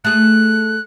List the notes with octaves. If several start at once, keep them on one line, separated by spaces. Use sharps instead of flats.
A3 G#4 F#6